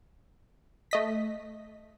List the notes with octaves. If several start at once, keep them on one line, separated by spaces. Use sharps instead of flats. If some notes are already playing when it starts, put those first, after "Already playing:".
A3 D#5 B6